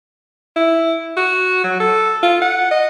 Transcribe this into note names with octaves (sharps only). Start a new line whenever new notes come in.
E4
F#4
F#3
A4
F4
F#5
D#5